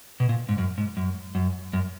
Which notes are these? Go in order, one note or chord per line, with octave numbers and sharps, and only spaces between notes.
B2
A#2
G#2
F#2
G#2
F#2
F#2
F#2